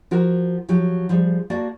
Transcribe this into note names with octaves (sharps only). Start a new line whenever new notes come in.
F3 F#4 A#4
F3 F#3 G4
F3 G3 G#4
A#3 F#4 D5 A5